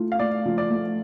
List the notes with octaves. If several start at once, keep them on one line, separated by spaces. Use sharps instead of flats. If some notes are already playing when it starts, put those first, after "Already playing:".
Already playing: A3 F4
F5
A3 D5
F3
D5
A3